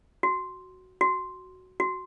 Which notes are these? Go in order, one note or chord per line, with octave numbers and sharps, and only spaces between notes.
F#4
F#4
F#4